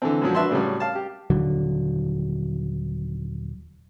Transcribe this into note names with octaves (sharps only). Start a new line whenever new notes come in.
D3 E3 C4
F#2 A#2 F3 F#3
D4 F#4 B4 E5 A5 C6
A2 C#3 F#3 G3
F5 A5
G4
D#1 D3 F#3